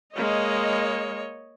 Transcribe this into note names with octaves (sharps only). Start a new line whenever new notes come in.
G#3 A#3 C#5 D#5